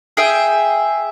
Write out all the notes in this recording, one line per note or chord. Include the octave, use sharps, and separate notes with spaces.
G#4 E5 G5